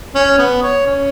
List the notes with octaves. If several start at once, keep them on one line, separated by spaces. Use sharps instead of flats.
C#4
B3
C#5
C#4